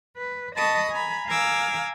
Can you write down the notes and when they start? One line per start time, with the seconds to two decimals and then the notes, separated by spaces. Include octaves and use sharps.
0.18 B4
0.56 D#5 A5 B5 C#6 D#6
0.90 G#5 A#5 B5
1.26 F5 G#5 A#5 D6 E6